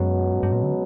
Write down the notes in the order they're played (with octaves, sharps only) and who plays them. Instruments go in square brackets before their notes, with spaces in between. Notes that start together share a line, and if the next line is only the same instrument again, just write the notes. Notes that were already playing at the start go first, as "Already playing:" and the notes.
Already playing: [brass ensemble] C#2 B2 F#3 [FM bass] F#2
[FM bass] G2
G2
A#2
D3